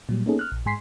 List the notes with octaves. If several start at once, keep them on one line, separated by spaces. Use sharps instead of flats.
A#2 F#3 G3
A#3 B3 C#4 D#4 G#4 A4
F6 F#6
A#1
G#2 G#3 G#5 C6 B6 C7